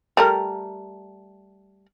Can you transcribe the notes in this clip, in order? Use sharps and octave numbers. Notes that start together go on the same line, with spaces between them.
G3 A3 A#4